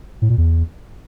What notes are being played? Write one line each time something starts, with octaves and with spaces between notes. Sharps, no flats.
A2
A#2
E2